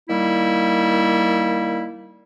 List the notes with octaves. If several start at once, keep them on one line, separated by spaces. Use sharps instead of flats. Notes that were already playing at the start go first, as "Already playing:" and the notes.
D#3 G3 A#3 E4